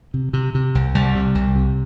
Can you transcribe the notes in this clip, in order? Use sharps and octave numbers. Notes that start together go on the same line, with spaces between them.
C3
C3
C3
C2
C2 G3
C3
C2
C3